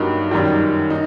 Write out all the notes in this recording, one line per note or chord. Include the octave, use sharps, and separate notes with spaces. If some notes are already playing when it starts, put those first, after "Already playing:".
Already playing: G2 F#3 A#3 D#4 G4
F#2 D#3 G3
D#4